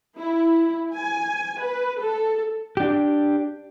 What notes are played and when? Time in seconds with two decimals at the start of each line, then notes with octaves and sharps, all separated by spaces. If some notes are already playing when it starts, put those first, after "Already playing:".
0.17 E4
0.95 G#5
1.60 B4
1.99 A4
2.77 D4 G4